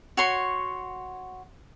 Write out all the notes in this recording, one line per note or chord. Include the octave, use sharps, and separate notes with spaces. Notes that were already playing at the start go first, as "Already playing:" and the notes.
F#4 C#5 C6